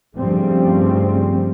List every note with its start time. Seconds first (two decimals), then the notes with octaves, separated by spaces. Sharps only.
0.16 G2 C#3 F3 G3 A3 C4